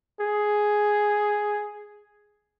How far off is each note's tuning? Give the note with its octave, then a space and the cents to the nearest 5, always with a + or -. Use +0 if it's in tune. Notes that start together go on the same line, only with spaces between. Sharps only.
G#4 +5